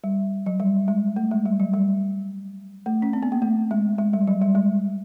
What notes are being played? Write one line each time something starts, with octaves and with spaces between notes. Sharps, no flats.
G3
F#3
G3
G#3
A3
G#3
G3
F#3
G3
A3
C#4
C4
B3
A#3
A3
G#3
G#3
G3
F#3
G3
G#3